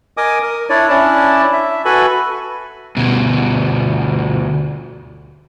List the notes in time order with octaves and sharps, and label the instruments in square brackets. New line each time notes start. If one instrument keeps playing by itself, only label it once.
[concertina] A#4 D#5 G#5 D6 D#6
A#4
D4 E4 C#5 D5
C#4 D4 E4 D5 A5
E5
F#4 A4 B4 G#5 B5
[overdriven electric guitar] D2 B2